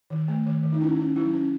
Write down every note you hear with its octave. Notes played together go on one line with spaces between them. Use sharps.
D#3
A3
D#3
D#3
D#4
C#4 E4
C#4
F#3 E4
C#4